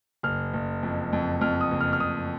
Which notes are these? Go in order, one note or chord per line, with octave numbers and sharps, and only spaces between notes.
F#1 F6
F#1
F2
F2
F2 F6
D#6
F#1
F6
F6
F#1 D#6